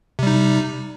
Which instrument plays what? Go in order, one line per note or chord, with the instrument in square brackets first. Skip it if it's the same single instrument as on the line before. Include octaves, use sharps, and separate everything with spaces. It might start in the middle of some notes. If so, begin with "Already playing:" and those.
[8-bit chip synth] C3
G3
D#4